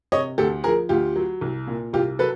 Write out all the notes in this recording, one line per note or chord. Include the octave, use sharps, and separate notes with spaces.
C3 C#5 D#5
D2 G4 A4
F3 G#4 A#4
D2 F4 G4
F#3
C2
A#2
C2 F4 G4
F#3 A4 B4